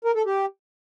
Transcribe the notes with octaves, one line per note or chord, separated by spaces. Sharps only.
A#4
A4
G4